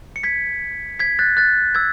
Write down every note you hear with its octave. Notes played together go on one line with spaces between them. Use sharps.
C#7
G#6 B6
G#6 B6
F#6 A6
F#6 A6
E6 G#6